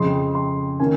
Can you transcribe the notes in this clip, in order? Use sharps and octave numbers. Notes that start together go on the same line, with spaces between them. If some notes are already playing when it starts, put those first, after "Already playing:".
Already playing: F2 C#3 G#3 C4 C6
C6
D#3 A#3 C#4 G#5